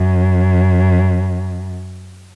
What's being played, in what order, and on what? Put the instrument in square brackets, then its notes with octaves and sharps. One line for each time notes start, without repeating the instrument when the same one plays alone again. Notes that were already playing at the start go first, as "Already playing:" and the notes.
Already playing: [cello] F#2